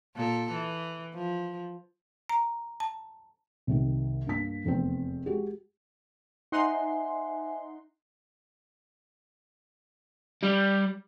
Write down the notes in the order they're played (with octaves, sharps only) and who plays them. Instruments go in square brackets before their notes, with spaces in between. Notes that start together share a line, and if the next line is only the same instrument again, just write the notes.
[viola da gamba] A#2 A4
E3
F3
[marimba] A#5
A5
[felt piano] C2 C3 D#3
G2 A#3 B6
F1 E2 C4
G#3 F#4 G4
[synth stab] D#4 F#5 C6 [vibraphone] C5 E5 G#5
[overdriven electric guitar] G3